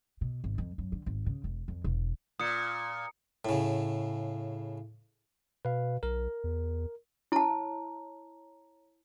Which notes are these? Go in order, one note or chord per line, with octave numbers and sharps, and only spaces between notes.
B2
G#1
F2
F#2
D3
G#1
C#3
E1
F2
E1
A#2 D#6 C#7
A2 C#3
B2 B4 F5
B1 A#4
E2
E4 C#5 A5 A#5